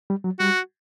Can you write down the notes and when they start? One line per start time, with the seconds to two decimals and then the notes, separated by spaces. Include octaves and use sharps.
0.10 G3
0.24 F#3
0.39 G3 F#4